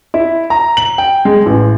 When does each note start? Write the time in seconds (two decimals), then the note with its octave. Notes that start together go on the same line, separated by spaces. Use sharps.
0.14 E4
0.50 A#5
0.77 F#7
0.98 G5
1.25 G#3
1.46 A1